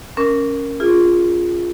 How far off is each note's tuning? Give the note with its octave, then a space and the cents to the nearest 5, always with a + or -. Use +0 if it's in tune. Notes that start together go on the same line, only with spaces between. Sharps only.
C#4 +0 A#4 +0 D6 -35
F4 +0 G#4 -10